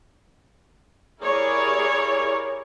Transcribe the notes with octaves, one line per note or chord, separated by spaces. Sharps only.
E4 G4 G#4 A#4 C#5 D5